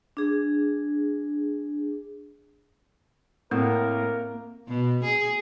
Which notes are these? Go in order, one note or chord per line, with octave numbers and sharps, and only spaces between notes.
D4 G#4
A2 A#3 C4 A4 A#4
B2
G#4